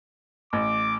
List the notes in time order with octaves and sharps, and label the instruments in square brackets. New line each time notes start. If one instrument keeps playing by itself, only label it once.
[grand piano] A1 [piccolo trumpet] D6